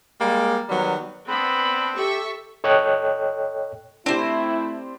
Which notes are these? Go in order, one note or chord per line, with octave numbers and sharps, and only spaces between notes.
G3 G#3 A#3
D#3 F#3 G3 B3
B3 C4 D4 B5
G4 A4 E5 C#6
A4 C#5 D#5 G5 F#6
A3 C4 D4 E4 G4 C5